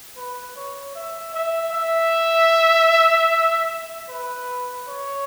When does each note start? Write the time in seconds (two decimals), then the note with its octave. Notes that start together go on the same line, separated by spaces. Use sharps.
0.17 B4
0.56 C#5
0.95 E5
1.34 E5
1.73 E5
4.09 B4
4.88 C#5